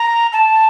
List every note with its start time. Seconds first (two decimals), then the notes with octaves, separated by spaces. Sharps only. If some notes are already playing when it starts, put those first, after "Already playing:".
Already playing: A#5
0.33 A5